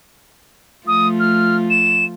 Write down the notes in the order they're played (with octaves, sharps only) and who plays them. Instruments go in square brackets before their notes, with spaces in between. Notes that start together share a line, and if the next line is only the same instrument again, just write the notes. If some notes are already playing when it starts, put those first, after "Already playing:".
[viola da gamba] F3 A3 F4 [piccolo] D#6
[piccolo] F6
E7